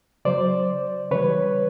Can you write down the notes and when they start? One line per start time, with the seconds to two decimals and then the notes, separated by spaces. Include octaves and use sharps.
0.25 C#3 F#3 C5 D5
1.11 C#3 E3 G3 B4 C#5